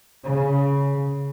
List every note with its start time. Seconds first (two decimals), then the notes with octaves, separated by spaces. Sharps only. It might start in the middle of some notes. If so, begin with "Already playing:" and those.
0.24 C#3
0.92 C#3